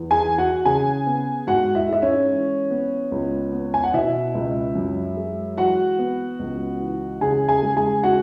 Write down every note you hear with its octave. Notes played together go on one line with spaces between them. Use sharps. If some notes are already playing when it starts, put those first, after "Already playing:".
Already playing: E2
G#4 G#5
E3
F#4 F#5
C#3 G#4 G#5
B3
G#2 F#4 F#5
E4 E5
G#3 E5
C#4 C#5
E3
B3
C#2
B3
G#5
F#5
B2 E4 E5
C#2
F#2
G#3
E3 F#4 F#5
B3
C#2
E3
C#3 G#4 G#5
G#4 G#5
G#3
G#4 G#5
F#4 F#5